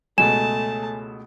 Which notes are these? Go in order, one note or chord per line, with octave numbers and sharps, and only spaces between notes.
C#2 B2 A3 G#5 A5 E7